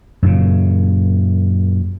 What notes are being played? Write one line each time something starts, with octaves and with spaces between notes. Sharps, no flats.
F#2 A#2 C#3